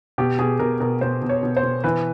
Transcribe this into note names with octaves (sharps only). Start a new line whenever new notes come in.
B2 G4
B2 G#4
B2 A#4
B2 A#4
B2 C5
B2
C#5
B2
C5
B2
E3 B4